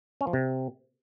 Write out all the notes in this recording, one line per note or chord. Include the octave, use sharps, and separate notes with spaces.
C#4
F3
C3